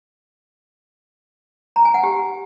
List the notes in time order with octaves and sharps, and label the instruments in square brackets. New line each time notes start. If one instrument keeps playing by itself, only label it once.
[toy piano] A#5
G#5
F#5
G4